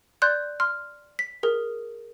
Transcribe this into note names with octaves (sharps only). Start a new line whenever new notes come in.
D5 C6 F#6 G6
C6 F6
B6
G#4 A#4